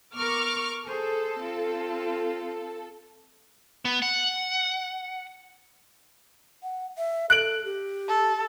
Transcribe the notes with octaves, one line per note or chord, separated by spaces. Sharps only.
B3 A#4 C#6 D6 F6
G#4 A4 C5
C4 F4
B3
F#5
F#5
E5
A4 F#6 D7 F#7
G4
A4